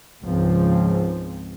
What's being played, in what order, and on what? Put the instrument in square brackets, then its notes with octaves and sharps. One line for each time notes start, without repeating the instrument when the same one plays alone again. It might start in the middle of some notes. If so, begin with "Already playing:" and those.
[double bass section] C#2 G#2 F3 C4